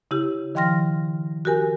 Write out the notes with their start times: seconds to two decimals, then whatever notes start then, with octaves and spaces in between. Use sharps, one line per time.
0.11 C#3 E4 G4
0.55 D#3 F3 G5 C6 F6 A#6
1.45 F#4 G4 A#4 G#5